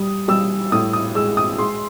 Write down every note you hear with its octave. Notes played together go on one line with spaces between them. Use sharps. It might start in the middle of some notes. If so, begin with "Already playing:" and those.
Already playing: G3 D#6
G3 E6
A2 D#6
D#6
G#3 E6
D#6
G#3 C6